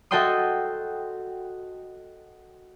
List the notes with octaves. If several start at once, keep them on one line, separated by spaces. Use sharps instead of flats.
F#4 A4 D#5 G5 C6 D#6